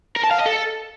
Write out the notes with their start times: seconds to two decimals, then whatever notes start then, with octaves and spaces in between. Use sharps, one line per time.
0.17 A#4
0.24 A5
0.31 F5
0.38 D#5
0.46 A4